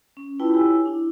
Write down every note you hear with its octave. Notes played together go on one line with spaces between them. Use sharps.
C#4
E4 F4 B4 G5 A5 B5
E4 G4 C#5 G#5 E6
D4 E4